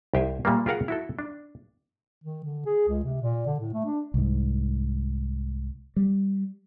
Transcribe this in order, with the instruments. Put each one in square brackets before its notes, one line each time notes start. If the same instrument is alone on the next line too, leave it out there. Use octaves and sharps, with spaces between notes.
[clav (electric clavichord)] C2 G4 C5 G#5
A#2 G3 A3 A#3
F4 G4 G#4 A#4 F5 F#5
E4 F#4 A4
D4
[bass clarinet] D#3
D3
G#4
C#2
C3
A#2
D3
A2
A3
D4
[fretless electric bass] C2 G#2
G3